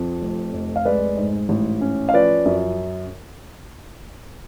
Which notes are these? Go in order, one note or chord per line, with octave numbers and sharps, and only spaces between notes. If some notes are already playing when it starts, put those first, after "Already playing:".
Already playing: F2 F3
F1
F1
F5
G#3 B4 D5
G#2
A1
C#4
F5
F3 B4 D5
F#2